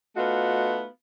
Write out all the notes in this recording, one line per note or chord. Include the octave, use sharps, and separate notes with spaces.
A3 B3 D#4 F4 F#4 F5